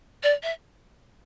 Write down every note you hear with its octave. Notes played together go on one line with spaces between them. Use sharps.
D5
E5